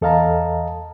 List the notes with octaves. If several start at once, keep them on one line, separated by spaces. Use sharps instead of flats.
E2 A4 D#5 F5 A5 A#5